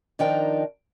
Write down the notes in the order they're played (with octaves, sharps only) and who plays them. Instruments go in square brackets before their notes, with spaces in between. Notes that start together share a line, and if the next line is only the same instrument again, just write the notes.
[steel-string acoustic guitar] D#3 F3 D4 D#4 A#4 G5